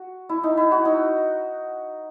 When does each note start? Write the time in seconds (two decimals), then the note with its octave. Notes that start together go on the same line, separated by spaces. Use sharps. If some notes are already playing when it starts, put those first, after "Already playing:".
Already playing: F#4
0.29 E4
0.44 D#4
0.57 E4
0.72 F#4
0.85 D#4